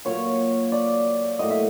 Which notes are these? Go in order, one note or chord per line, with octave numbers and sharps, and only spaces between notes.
A#2 F#3 A#3 C#5
D5
A2 F#3 A#3 D#5
E5